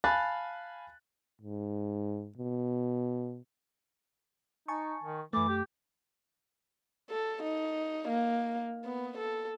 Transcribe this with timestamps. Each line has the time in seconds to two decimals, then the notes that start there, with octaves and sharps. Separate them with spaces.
0.04 F5 G#5 A5 B5 F#6 A6
1.41 G#2
2.37 B2
4.68 D#4 G#5 A5 C#6
5.03 D#3
5.33 F#2 E3 A3 D6
5.48 G4
7.10 A4
7.43 D#4
8.08 A#3
8.85 B3
9.18 A4